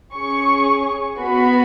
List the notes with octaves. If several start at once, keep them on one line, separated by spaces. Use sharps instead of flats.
C#4 G#4 C#6
B3 F#4 B5